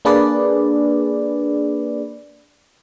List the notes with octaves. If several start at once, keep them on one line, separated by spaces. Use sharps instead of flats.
A#3 D4 G#4 B4 D5